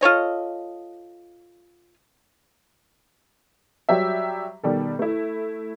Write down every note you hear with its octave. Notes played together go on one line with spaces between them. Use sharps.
F4 A4 C#5 D#5
F#3 G3 G4 E5
B2 D#3 G3 A4
A3 E4